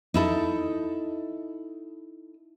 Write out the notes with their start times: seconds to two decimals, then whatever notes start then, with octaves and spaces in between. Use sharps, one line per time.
0.14 D#4 E4 A4